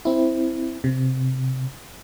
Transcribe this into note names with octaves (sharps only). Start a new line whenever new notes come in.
C4 E4
C3